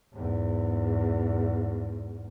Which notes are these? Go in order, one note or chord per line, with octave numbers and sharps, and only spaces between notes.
E2 G#2